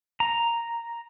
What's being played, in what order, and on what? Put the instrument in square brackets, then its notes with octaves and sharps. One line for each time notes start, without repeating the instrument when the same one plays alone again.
[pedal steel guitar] A#5